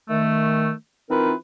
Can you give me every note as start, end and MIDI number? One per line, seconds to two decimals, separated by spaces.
0.09 0.70 51
0.09 0.70 57
1.11 1.33 52
1.11 1.33 60
1.11 1.33 63
1.11 1.33 65
1.11 1.33 70
1.11 1.33 71